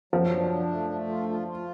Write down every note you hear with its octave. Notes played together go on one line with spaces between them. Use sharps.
F3 F#3
D4
D4
A3
A3
F4
F4
F4